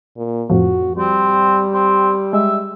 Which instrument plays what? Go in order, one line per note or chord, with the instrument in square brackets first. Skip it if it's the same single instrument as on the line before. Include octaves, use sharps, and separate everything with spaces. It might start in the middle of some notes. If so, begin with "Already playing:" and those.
[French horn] A#2
[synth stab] F2 A2 F3 [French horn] F#4
[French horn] G3 [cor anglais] C4
[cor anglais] C4
[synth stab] G#3 [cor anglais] E5